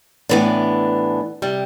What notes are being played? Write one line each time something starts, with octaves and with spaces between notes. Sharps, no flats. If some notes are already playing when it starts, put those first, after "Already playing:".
A2 E3 B3 D4
C3 G3